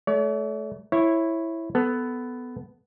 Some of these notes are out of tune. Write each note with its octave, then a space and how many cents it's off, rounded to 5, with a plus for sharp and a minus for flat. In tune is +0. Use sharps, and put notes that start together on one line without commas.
A3 -30 C#5 +45
E4 +0 C#5 -20
B3 +10 A4 -5